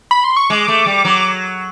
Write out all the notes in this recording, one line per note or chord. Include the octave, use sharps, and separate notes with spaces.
B5
C6
C#6
G#3 D6
A3
G3
F#3